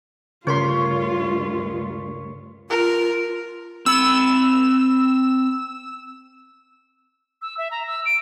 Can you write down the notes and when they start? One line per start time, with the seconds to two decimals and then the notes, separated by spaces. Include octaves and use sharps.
0.47 D2 G2 C#3 F4 A#4 C#5 C6 B6
2.70 F4 A#4
3.86 C4 B5 E6
7.42 E6
7.58 E5
7.71 A#5
7.87 E6
8.05 D7